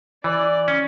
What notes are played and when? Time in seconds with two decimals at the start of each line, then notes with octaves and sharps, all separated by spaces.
0.24 E3 D5
0.68 C#4